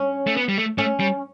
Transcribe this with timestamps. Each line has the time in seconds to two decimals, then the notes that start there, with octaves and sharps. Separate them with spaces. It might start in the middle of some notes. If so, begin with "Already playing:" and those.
Already playing: C#4
0.27 A3
0.37 B3
0.49 G3
0.58 A3
0.78 A3 C#4
1.00 G3